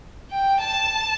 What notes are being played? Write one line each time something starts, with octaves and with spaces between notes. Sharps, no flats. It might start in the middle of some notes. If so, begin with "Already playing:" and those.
G5
A5